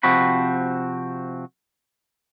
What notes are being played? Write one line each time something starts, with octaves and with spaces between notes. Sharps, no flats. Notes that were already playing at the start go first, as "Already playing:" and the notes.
C3 F3 C4 F#4 B5